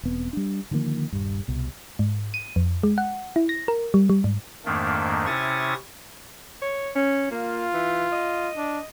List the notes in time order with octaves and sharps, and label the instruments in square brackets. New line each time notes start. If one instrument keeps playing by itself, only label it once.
[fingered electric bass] E1 B3 C4
G3 D4
D3 D#3 F3 A#3
D#1 G2
C2 B2
[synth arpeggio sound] G#2
D#7
F2
G#3
F#5
E4
A#6
A#4
G3
G3
G#2
[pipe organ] F2 G#2 D#3 A3 A#3 D4
C3 C#4 E4 C#6 D#6 A6
[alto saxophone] C#5
C#4
[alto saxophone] A#3 [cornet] F4
[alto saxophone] E3
D#5
[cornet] D4